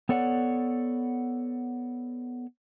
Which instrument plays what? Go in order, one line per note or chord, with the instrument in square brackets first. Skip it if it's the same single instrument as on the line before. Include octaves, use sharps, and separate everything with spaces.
[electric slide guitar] B3 A4 C#5 D5 F#5